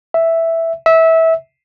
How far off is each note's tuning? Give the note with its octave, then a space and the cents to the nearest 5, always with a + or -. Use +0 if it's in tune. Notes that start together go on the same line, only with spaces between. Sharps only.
E5 +0
E5 -20